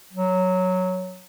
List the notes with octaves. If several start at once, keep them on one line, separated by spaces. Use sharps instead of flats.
F#3